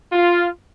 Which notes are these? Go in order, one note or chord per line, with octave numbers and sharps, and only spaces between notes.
F4